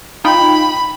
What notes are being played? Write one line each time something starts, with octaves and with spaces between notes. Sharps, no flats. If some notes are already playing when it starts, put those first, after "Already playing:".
D#4 F4 G5 B5